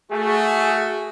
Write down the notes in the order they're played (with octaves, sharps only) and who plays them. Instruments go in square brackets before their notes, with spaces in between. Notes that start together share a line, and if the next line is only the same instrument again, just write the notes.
[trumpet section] A3 F#4 [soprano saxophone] G#4